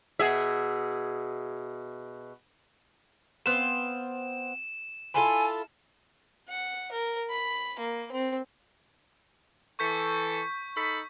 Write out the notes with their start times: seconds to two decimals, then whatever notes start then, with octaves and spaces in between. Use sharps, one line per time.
0.19 B2 G#4 E5
3.46 B3 C4 F5 E7
5.14 E4 F4 A4 G#5
6.49 F#5
6.92 A#4
7.30 B5
7.79 A#3
8.12 C4
9.79 E3 A4 C#6 G6 B6
10.75 D#4 A4 B5